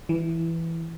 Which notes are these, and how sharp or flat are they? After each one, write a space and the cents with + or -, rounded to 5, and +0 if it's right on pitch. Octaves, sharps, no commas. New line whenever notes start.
E3 +5